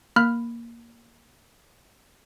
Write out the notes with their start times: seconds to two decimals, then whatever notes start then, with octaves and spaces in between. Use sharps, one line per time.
0.16 A#3 B5 F6 F#6